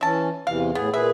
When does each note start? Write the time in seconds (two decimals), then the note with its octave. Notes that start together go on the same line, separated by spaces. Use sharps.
0.01 E3 C#4 E5 A5
0.47 E2 C3 E3 F5
0.75 A2 B3 G#4
0.94 A#2 G#4 B4 E5